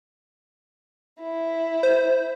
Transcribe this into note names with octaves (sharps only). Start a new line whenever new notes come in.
E4
C5